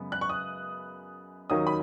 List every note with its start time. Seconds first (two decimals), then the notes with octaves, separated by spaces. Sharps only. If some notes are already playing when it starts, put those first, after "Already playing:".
Already playing: F#2 C#3 G#3 B3
0.12 F#6
0.21 C#6
0.29 D#6
1.50 D#2 D#3 F#3 C#4 D#6
1.67 B5